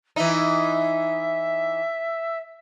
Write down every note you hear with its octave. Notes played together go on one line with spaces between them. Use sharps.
E3 D#4 E5